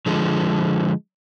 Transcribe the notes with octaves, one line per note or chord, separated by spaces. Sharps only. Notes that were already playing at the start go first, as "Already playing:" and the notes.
D3 F3 G#3